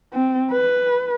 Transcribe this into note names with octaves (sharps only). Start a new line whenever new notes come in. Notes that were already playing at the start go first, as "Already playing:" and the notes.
C4
B4